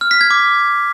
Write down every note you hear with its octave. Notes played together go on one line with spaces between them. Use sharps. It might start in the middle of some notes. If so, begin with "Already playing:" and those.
F6
B6
G#6
D6